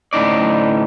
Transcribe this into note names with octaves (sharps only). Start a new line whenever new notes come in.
D2 A2 C#4 D#4 D5